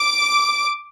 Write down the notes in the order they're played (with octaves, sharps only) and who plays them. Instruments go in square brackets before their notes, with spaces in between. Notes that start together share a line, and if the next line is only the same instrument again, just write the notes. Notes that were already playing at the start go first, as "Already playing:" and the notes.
Already playing: [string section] D6